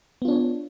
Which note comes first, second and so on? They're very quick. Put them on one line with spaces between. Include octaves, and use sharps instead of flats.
B3 F4 D4 C#5